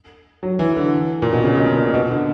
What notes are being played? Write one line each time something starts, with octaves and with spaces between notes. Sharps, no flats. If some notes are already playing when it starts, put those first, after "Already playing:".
F#3
E3
D3
A#2
B2
C#3
C#3
B2
A#2
B2
D3